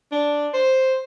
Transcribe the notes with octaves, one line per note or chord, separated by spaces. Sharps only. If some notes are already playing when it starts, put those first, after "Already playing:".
D4
C5